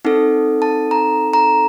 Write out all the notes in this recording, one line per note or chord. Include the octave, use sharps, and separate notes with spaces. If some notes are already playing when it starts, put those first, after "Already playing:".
C4 D#4 A4
A5
A#5
A#5